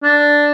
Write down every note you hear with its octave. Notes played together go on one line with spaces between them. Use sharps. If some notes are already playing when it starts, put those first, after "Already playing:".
D4